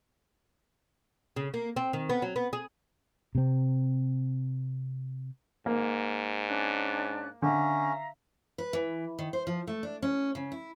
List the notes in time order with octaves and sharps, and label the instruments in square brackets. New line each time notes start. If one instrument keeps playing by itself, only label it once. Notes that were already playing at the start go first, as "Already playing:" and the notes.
[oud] C#3
A#3
C4
D#3
B3
F#3
B3
G#4
[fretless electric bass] C3 C4
[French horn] G#2 [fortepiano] A#3
[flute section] C#4 D4 F#6
[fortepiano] D3 [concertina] C#4 [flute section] E5 F5 A#5
[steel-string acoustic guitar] B4
E3
D#3
C5
F3
A3
D4
C#4
C#3
E4